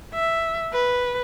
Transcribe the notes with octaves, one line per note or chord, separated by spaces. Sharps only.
E5
B4